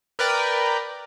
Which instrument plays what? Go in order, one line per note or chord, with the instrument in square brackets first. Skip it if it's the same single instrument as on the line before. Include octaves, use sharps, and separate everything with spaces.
[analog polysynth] A#4 B4 D5 G5